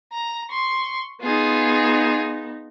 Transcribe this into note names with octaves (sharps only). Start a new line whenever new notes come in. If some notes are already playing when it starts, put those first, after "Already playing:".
A#5
C6 C#6
B3 D#4 F4 G#4